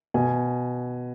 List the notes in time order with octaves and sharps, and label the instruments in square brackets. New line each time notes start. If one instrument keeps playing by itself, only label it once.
[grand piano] B2 G#5